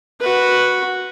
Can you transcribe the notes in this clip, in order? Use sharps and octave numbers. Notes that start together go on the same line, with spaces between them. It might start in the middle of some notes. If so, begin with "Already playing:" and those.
F#4 B4